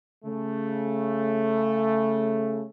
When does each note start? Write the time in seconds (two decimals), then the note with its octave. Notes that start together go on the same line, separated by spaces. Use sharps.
0.25 C#3 A3